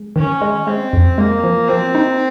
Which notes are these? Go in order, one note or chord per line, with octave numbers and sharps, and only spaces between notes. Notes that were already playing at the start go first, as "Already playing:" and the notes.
Already playing: G#3
D#3 C#4
G#3
G#3 C4
F2
G#3 A#3
F3
F3 C4
D#4